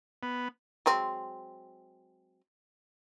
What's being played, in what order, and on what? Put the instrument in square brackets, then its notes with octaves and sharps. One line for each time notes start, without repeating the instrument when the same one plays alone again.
[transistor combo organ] B3
[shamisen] F#3 G#3 C4